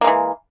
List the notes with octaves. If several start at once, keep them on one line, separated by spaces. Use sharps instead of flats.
E3 G#3 A#3